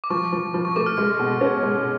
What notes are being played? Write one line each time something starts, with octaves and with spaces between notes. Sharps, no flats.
D6
F3 C#6
F3
F3
C#6
A3 D6
F6
G#3 F6
B2
C#4
G#3